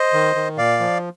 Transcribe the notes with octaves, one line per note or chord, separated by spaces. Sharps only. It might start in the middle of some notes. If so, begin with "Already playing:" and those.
Already playing: C5 D#5
D#3
D#3
A#2 D5 F5
F3